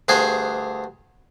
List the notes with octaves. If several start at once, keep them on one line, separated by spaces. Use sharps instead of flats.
D2 G2 G#4 C5 G#5